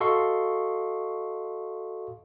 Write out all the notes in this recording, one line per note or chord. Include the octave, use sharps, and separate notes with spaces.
F#4 A4 D#5 F5 C6 C#6